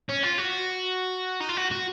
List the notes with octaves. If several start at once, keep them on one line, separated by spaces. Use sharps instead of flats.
C#4
F4
F#4
D#4
F4
F#4
F#4